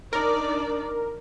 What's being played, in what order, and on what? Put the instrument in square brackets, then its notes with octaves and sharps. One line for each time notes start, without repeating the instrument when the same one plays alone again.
[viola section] D4 D#4 D5 [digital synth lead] A#4